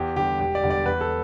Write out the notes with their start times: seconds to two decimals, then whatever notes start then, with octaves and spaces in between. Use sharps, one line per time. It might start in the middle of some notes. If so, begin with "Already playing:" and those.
Already playing: E2 G4
0.16 D3 G3 G4
0.40 E1 G4
0.55 D5
0.63 E2 D3 G3
0.70 D5
0.86 E2 B4
1.01 A4